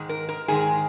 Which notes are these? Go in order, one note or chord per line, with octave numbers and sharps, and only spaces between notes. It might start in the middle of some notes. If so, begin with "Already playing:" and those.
Already playing: G#2 D#3 G#3
A#4
A#4
G#2 D#3 G#3 G#4